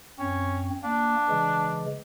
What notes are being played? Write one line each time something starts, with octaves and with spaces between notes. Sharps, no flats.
F#2 C4 C#4
A#3 D4
C#3 E3 G#3